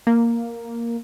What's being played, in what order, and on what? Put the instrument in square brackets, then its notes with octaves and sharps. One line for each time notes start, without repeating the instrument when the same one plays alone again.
[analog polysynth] A#3